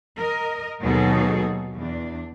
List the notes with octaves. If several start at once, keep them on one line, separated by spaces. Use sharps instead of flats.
A#4 D#5
D#2 B2 F#3 D#4 G#4 A4
E2 D4